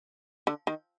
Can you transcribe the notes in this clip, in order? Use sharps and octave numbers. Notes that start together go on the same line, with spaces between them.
D3
D#3